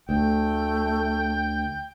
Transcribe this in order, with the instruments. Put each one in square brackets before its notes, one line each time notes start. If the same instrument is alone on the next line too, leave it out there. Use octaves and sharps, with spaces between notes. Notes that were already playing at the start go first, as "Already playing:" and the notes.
[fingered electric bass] D2 [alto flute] A3 [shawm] G5